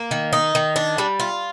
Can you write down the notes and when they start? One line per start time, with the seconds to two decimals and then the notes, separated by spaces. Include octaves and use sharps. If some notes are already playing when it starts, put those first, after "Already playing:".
Already playing: A#3
0.11 D#3
0.33 D#4
0.55 D#3
0.76 D4
0.98 G3
1.20 F4